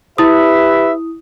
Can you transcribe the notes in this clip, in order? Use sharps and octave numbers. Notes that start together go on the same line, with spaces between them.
E4 G4 B4 E5 D#6